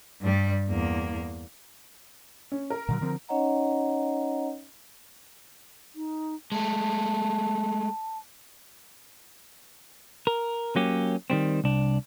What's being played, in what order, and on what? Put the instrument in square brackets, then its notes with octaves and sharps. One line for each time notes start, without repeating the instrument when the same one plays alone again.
[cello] G2 G3
E2 A#3
[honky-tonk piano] C#4
A#4
[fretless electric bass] A#2 D3 F#3
D3 F3 C4
[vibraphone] C#4 D#4 C#5 D#5 F#5 A#5
[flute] D#4
[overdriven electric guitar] G#3 A3 [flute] A5
[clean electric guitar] A#4
F#3 A#3 C#4 G4
D#3 G3 C4
C2 D4